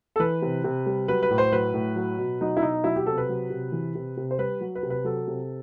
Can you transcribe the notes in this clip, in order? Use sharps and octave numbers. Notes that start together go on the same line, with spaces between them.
A4
E3 B4
C3
C3
G3
F#3 B4
B4
A2
C5
F#3 B4
A2
F#3
B2
F#3 D#4
E4
B2 D#4
F#3 E4
G4
C3 A4
B4
F#3
C3
E3
C3
C3
C5
G3 B4
F#3
B4
C3
B4
F#3 A4
C3